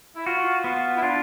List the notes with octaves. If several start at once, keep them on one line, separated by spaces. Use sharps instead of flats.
E4
F4 F#4
B3 F4
E4
D4 F4